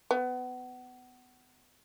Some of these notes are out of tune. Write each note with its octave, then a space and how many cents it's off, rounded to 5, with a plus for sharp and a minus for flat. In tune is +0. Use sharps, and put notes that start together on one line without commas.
B3 +25